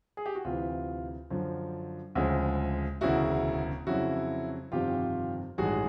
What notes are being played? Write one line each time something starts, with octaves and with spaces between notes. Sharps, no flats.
G#4
G4
F#4
D2 C3 E3 F4
F#2 D3 F3
D2 C#3 F3 G#3
E1 D2 C#3 E4 F#4
F2 C#3 F#3 E4 F#4
G1 F2 C3 D#3 F4 G4
A1 G2 D#3 G#3 F#4 G#4